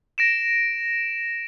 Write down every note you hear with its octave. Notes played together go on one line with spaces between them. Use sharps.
A#6 D7 E7